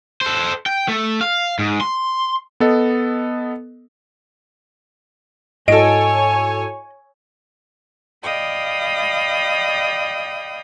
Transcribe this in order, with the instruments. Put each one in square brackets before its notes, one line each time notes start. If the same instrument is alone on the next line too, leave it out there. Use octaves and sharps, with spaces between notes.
[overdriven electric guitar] A4 C5
G5
A3
F5
G#2
C6
[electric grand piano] B3 A4 D#5
[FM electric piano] G#2 E4 F#4 [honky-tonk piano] A4 D7 [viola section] C#5 G#5 [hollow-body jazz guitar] D#5
[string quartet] D5 D#5 F5 G5 B5 D#6